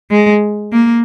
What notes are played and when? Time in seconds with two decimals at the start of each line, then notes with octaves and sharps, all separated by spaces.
0.11 G#3
0.72 A#3